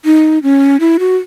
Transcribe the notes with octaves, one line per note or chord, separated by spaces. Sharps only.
D#4
C#4
E4
F#4